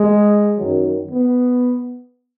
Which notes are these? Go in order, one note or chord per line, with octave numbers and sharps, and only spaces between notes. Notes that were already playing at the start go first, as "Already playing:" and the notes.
Already playing: G#3
F#2 D#3 F#3
B3